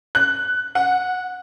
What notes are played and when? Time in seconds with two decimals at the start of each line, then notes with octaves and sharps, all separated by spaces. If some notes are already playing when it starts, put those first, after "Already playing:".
0.15 F#6
0.75 F#5